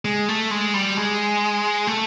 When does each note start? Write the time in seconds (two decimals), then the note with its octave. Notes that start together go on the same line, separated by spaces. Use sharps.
0.05 G#3
0.29 A3
0.51 G#3
0.74 G3
0.97 G#3
1.87 A3